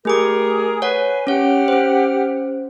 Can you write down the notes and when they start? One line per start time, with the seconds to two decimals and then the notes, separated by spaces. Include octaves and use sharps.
0.05 A3 G4 G#4 A#4 D6
0.82 B4 C#5 F#5 G#5
1.27 C#4 G4 C#5 F#5 F6
1.68 C#4 C5